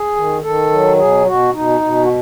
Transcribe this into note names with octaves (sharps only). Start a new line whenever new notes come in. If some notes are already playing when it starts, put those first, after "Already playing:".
Already playing: G#4
D#3
D#3 A4
F#3
B2 G#4
B2 F#4
B2 D#4
B2
F#4